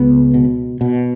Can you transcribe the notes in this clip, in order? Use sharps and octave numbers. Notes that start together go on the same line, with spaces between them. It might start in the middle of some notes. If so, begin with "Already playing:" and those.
Already playing: C#2 B3
B2
B2